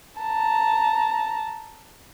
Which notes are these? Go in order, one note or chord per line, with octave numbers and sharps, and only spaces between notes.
A5 A#5